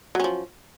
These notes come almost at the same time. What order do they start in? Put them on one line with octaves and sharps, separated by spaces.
F#3 C#4 F3